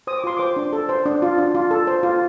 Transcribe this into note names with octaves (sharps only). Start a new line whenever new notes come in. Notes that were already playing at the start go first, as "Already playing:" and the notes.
C5 D#6
D6
F4 C6
C5 D6
D4
A4
C5
D4
F4
D4
F4
A4
C5
F4